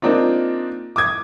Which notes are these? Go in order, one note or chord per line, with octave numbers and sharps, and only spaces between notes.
A#3 C4 D4 D#4 F4
D6 D#6 G#6